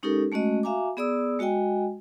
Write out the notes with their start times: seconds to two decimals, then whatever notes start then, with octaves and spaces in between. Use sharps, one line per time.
0.03 G#3 C#4 D#4 G4 A4 A#4
0.32 G#3 A3 C#4 F#4 D#5
0.63 F#4 E5 F5 G#5 A#5 D6
0.97 B3 G#4 D5 D#6 E6
1.39 G#3 F#4 D#5 G5 G#5